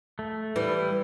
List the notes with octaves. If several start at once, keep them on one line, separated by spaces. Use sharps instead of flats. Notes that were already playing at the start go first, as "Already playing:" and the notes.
A3
E3 G3